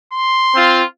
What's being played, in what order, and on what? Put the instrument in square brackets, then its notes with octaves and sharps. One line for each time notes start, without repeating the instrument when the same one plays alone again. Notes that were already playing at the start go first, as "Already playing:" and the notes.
[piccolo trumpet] C6
[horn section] C4 F4